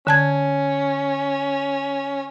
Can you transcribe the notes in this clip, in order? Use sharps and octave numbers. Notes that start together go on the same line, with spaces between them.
D3 C#4 A5 G#6